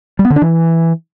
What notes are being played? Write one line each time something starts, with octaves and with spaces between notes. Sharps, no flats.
G3
B3
D3
D4
E3